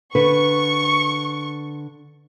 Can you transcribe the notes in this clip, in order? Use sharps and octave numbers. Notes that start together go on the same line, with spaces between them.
D3 B4 C#6